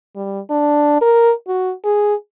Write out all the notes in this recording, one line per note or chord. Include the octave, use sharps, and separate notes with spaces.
G3
D4
A#4
F#4
G#4